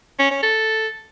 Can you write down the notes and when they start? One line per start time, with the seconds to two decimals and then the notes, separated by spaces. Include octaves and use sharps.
0.19 C#4
0.31 C#4
0.43 A4